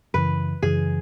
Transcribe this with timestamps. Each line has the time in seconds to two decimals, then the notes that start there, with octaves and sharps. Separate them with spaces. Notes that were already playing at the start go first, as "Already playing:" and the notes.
0.14 F#2 C#3 E3 B4
0.62 F#2 C#3 E3 G#4